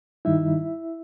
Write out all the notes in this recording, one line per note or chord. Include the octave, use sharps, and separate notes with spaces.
G2 D#3 G3 D#4 E4 E5